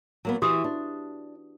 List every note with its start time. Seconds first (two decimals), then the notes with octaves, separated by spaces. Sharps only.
0.25 F#3 A#3 B3
0.42 E3 F#4 G4 D#6
0.64 D4